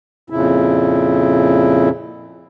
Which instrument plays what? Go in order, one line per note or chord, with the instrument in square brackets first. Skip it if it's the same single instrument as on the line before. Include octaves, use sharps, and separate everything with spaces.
[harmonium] F2 A#2 C#3 E4